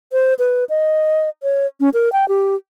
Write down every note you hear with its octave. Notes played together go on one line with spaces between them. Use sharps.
C5
B4
D#5
C#5
C#4
A#4
G5
G4